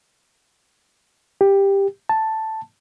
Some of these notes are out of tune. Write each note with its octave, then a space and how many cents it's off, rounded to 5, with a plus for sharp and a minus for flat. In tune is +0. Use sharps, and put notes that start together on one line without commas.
G4 +10
A5 +0